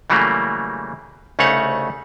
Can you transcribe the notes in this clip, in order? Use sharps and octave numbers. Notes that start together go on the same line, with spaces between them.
C#3 E3 F#3 G3 A3 A#3
C2 C#3 A3 D#4 C#5 F#5